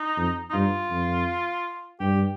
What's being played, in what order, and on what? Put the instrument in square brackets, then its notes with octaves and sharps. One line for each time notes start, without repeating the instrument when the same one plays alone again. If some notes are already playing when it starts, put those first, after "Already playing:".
Already playing: [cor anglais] D#4
[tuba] F2
[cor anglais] D#4
[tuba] G2 [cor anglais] F4
[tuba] F2
[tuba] G2 [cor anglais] G4